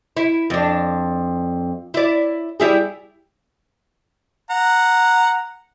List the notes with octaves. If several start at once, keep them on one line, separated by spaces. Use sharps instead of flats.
E4
F2 D4
E4 D5
G3 E4 G#4
F#5 A#5